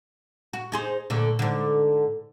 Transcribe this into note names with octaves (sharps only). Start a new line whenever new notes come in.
F#4
D#4 G#4 C5
A#2 D3 A3
G#2 D3